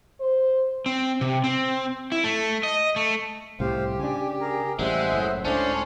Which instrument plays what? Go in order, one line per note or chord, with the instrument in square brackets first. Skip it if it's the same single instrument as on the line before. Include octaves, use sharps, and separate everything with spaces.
[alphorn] C5
[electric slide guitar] C4
C3
C4
E4
A3
D#5
A3
[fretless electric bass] C2 A2 C3 [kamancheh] G4 [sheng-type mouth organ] C5 F5
[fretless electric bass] C#3 D4 [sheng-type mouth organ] G#5
[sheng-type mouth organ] G#4 A#4 A#5
[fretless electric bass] A1 G3 [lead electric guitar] G#3 [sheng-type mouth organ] C5 F#5 [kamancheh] E5
[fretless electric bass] F#1 A2
[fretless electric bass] C#2 A2 [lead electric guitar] C#4 [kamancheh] D4 [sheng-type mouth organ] C5 A5 C6